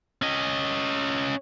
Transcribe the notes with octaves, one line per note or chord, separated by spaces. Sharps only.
C#4 D#5